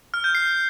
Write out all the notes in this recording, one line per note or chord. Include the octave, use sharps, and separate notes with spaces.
F6
G6
C7